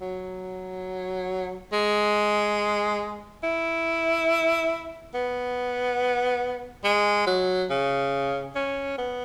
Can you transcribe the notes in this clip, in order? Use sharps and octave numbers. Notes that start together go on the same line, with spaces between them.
F#3
G#3
E4
B3
G#3
F#3
C#3
C#4
B3